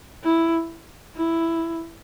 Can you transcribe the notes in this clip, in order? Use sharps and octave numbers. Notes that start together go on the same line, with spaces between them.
E4
E4